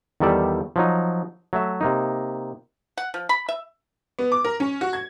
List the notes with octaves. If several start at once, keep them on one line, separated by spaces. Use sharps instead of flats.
E2 D#3 G3 A4 D5 E5
F3 F#3 D#4
F#3 A3 E5
C3 A#3 D#4
F#5
F3
B5
E5
B3
D6
A#4
C#4
F#4
G#6